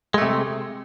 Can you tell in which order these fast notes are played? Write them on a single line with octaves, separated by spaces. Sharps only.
G#3 A3 C3